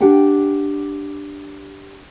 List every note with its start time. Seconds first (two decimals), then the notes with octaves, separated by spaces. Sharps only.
0.01 D4 G4 F#5 G5